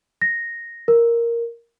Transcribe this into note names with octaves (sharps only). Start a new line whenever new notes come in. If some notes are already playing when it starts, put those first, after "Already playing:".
A#6
A#4